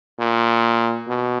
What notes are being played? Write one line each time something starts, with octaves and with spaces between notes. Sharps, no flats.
A#2
B2